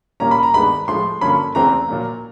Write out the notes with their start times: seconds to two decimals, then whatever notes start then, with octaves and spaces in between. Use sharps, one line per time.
0.20 A#2 G3 A#3 C#4 A#5
0.31 B5
0.43 A#5
0.54 G2 D#3 G#3 B3 B5
0.88 A2 F3 G#3 C6
1.21 G2 D3 F#3 A#3 C#4 B5
1.55 E2 C#3 E3 A3 C4 A#5
1.88 A#2 F#3 A#3